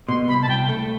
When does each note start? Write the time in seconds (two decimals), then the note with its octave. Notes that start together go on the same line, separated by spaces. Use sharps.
0.08 B2 C6
0.28 C2 B5
0.42 A5
0.48 C2 G5
0.69 A3